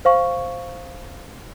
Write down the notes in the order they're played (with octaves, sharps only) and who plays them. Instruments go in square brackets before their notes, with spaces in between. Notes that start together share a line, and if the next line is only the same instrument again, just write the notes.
[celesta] C5 F5 C#6